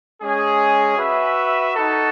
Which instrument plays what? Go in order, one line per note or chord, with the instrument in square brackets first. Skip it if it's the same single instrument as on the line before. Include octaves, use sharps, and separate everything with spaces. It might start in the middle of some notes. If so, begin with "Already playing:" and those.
[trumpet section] G#3 C#4 G#4
F#4 B4 E5
D#4 F#4 A4